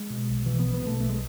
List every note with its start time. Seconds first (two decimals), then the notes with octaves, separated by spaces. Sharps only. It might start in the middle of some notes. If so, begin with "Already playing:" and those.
Already playing: G#3
0.10 B2
0.29 B1
0.46 B2 E3
0.59 B3
0.65 B1
0.74 B3
0.82 B2
0.87 A3
0.99 B1 A3
1.09 G#3